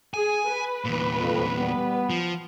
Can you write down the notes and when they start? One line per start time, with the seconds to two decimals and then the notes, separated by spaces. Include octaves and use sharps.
0.14 G#4 G#5
0.48 B4
0.85 E2 A#2
1.19 F2
1.56 G3 B3
2.10 F3